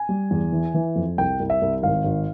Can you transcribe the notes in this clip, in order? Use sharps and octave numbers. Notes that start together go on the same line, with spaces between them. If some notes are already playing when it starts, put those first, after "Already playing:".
Already playing: G#5
G3
E2
E3
E3
F2
C2 G5
C2
E5
C2
G#1 F5
G#1